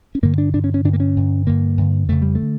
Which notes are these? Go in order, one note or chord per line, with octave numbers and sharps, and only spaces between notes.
C#4
G2 D3 A#3
D4
G2 D3 D4
C#4
C#4
G2 D3 D4
A#3
C#4
G2 D3
G2 D3 A#3
G2 D3
F2 C#3 A3
G3
A3
D3